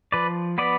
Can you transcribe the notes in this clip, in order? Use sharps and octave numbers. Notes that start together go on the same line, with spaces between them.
F3 B4 D5
B3 B4 D5